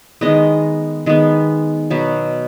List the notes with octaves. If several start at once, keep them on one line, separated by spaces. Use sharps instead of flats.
D#3 G#3 B3 D#5
D#3 G#3 B3
B2 F#3 B3